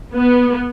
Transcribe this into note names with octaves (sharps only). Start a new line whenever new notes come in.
B3